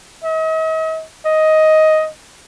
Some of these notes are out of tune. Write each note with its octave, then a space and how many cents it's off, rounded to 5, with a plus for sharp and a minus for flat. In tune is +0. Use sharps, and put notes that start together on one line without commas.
D#5 +45
D#5 +10